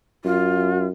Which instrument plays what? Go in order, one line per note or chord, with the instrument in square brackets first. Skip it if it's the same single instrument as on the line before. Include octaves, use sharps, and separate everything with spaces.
[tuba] F#2 [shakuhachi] F4